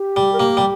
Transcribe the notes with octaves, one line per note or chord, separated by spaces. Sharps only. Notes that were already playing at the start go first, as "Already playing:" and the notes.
Already playing: G4
G3
A#4
A#3 G4
G3